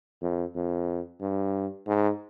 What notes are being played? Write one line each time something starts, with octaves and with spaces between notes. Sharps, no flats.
F2
F2
G2
G#2